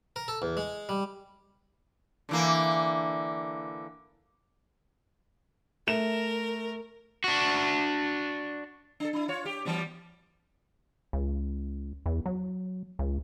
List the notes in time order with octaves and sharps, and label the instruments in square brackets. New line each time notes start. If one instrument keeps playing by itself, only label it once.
[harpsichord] A#4
A4
E2
G#3
G3
[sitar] D3 E3 A#3
[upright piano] A3 E7 [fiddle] A#4
[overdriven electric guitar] D4 F#4
[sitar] D4 A4
D4 E4
F4 C#5
G4
E3 G3 B3
[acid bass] C#2
E2
F#3
C#2